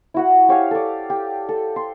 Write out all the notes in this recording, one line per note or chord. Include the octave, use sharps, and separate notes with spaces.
E4 F#4 F#5
G4 C#5 F5 G#5
A4 D5
G4
A4
C6